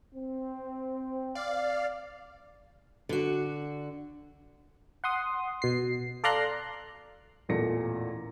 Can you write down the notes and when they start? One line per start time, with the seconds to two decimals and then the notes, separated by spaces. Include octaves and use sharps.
0.14 C4
1.35 D5 F5
3.09 D3 F#4
5.04 F#5 C6 D#6
5.62 B2 C7
6.24 A4 D5 F5 A#5 C6 F#6
7.49 A1 E2 A#2 A4 A#6 C#7